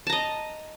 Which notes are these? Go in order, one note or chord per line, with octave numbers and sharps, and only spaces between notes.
D#5 A5 A#5